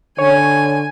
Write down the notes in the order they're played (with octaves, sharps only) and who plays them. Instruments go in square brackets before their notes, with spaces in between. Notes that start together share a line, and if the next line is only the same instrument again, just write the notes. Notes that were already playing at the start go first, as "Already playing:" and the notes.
[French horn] D3 [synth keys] C#5 [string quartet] G#5